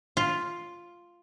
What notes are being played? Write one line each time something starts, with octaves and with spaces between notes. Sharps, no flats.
F4